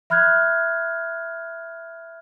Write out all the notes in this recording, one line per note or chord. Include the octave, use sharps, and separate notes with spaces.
E5 B5 F6 F#6 G#6